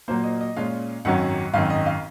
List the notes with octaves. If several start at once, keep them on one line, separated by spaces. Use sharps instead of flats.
A#2 F#3 A#3 C5
D#5
D#5
A#2 G#3 C#4 F4 F5
G#1 F#2 D#3 F#3 C#4 F#5
G#1 F#2 D#3 F5
D#5
F5